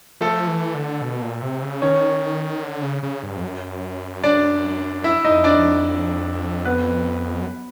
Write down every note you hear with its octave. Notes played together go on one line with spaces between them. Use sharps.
F3 A3 A4
E3
D3
B2
A#2
C3
C#3
D#3 C#4 C#5
D3
C#3
C#3
G2
F2
F#2
D4 D5
E4 E5
D#4 D#5
F2
D4 D5
F2
B3 B4
F#2